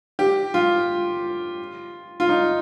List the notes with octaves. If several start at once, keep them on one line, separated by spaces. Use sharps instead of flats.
G4
F4
F4
D#4